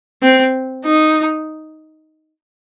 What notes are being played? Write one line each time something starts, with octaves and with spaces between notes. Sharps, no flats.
C4
D#4